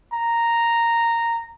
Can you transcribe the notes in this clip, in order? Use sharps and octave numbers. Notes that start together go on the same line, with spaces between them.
A#5